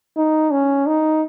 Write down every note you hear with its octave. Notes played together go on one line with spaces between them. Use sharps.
D#4
C#4
D#4